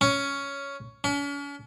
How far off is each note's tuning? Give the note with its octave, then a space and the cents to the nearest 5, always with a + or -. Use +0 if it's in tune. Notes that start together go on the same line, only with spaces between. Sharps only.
C#4 +5
C#4 +40